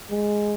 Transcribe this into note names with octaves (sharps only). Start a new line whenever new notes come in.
G#3